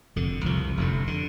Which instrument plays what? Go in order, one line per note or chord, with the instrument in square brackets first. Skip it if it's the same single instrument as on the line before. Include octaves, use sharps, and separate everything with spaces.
[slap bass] F1 F2 D3
C2 C3 F3
F1 F2 D3
D3